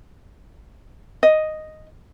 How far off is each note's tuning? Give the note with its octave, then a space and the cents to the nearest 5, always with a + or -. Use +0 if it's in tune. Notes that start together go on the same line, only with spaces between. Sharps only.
D#5 +0